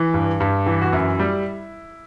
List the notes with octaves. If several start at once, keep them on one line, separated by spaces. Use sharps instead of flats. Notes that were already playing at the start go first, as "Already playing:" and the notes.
Already playing: E3
G2
G2
E3
F#4
F#2 E4
G3